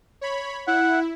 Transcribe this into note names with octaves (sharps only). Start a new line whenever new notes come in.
C#5 B5
E4 F#5